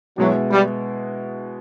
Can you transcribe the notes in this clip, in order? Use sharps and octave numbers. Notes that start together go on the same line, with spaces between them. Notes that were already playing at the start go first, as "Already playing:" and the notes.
B2 F#3 G#3 B3 E4
G3